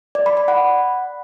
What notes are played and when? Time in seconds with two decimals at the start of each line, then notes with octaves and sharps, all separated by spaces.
0.15 D5
0.26 B5
0.37 B5
0.48 F#5